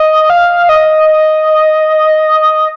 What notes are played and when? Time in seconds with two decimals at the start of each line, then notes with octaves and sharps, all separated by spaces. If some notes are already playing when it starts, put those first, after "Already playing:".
Already playing: D#5
0.30 F5
0.69 D#5